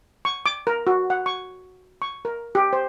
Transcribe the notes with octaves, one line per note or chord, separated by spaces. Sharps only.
C#6
D6
A#4
F#4
F#5
C#6
C#6
A#4
G4
C5